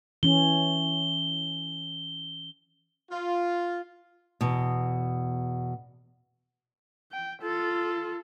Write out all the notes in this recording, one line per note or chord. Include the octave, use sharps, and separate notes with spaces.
E3 C#4 G7
F4
E2 B2
G5
F4 A4